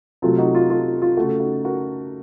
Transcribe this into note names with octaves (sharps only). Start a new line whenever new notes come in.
C3 F#3 A3 F4
D#4 F#4
F4
F4 A4
F4
C#3 A3 F#4
A4
D#4 F#4
F#4 A#4